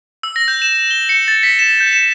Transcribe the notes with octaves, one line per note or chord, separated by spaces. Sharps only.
E6
A#6
G6
E7
G7
C#7
A6
B6
E7
G6
E7